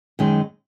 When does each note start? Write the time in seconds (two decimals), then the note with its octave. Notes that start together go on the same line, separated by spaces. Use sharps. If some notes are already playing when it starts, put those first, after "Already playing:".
0.19 F#2 D#3 G#3